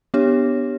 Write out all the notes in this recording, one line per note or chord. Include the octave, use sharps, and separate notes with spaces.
B3 D4 G4 C#5